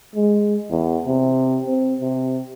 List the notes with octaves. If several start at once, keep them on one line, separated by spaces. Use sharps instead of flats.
G#3
E2
C3
C4
C3